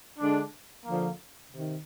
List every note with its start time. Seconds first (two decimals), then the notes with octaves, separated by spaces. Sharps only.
0.19 D3 G#3 D4
0.85 D3 F3 A#3
1.52 C3 D#3